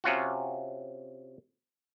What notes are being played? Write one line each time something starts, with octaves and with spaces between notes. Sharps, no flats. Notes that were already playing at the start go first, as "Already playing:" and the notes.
C3 C#4 F4 F#4